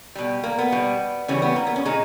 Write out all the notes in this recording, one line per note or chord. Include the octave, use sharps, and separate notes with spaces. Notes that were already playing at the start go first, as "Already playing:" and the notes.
B2 G3
A#3
B3
B2 G3
C#3 E3 G3 C#4
B3
A#3
B3
C#4
A#2 G#3 D#4